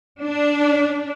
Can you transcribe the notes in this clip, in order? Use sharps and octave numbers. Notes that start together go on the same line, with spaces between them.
D4